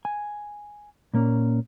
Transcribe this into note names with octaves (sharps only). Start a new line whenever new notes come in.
G#5
A#2 A#3 C#4